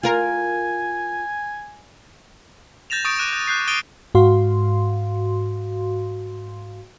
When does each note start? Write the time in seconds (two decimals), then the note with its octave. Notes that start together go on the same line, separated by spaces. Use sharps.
0.03 F4 A#4 G#5
2.90 G6 A6 A#6 E7 F7
3.05 C#6 D#6 G6 A6 D7
3.19 D6 F#6 D#7 E7
3.33 G6
3.48 F#6 G6 C7
3.67 D#6 F#6 A6 D7 D#7 G7
4.15 G#2 F#4 F5 C6